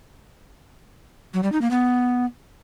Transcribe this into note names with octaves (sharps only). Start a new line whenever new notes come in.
F#3
G3
D#4
A#3
B3